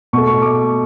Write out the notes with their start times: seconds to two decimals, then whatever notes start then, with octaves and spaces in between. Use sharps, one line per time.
0.13 B2 C#6
0.17 A3
0.27 C#6
0.42 D6